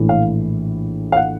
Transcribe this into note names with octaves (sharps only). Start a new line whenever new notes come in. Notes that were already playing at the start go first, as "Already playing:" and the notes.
Already playing: A#1 A2 E3
F5
F5
F#5